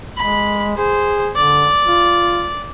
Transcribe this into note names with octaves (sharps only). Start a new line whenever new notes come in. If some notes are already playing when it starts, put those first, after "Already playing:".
G#3 B5
G#4 C5
D3 D5
F4